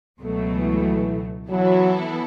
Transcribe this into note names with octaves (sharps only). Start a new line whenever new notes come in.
C#2 B2 F#3 A3
E3
E3 F#3 B3 E4 A4